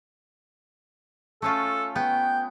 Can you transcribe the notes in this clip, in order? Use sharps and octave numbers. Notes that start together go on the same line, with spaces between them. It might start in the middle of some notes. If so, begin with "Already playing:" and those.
A3 C#4 F4 A4
B3 G5